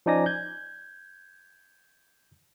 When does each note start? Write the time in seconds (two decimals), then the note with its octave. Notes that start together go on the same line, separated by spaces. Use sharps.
0.06 F3 C#4 D#4 D5 G#5 A#6
0.26 G6 G#6